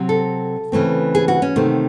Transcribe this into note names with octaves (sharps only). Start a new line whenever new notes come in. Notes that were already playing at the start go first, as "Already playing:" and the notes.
Already playing: C3 F#3 C4
A4
C#3 E3 A3 C4
G#4
F#4
C#4
C3 D#3 A3